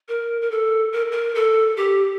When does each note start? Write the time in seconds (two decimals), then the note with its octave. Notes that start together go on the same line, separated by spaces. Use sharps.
0.08 A#4
0.41 A#4
0.51 A4
0.92 A#4
1.12 A#4
1.35 A4
1.77 G4